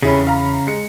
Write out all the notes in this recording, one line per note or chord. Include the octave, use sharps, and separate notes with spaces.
F1 E2 C#3 C#4 E4 G#4 B5
F5 A#5
G#3 C#7